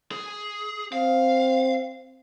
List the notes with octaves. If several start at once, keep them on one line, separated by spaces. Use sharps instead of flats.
G#4
C4 F5